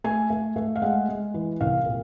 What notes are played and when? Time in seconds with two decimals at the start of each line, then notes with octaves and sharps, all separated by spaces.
0.04 A3 G#5
0.30 A3
0.56 A3
0.76 F5
0.82 G#3 F#5
1.09 G#3
1.34 E3
1.61 C2 F5
1.86 A#2